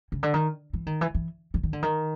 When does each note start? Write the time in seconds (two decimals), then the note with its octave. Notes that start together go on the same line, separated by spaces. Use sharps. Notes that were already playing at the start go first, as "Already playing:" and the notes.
0.12 C#3
0.23 D3
0.34 D#3
0.73 E3
0.86 D#3
1.01 E3
1.14 E3
1.54 E3
1.63 D#3
1.73 D3
1.83 D#3